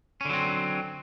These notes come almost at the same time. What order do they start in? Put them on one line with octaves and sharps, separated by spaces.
C#4 D3 F#3 C4